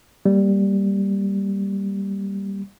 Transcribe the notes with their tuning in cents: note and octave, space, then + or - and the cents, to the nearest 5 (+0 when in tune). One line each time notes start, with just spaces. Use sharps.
G3 +0 A#3 +0